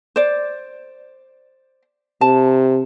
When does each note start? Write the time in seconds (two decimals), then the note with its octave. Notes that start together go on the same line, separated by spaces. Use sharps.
0.16 C5 D5
2.21 C3 A5